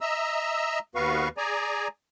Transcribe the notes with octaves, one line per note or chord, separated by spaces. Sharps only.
D#5 E5 A#5 E6
D#2 B3 F#4 B4 F5 C#6
G#4 D5 G#5 A#5